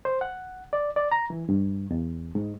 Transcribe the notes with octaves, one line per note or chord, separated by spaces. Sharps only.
C5
F#5
D5
D5
A#5
E3
G2
E2
G#2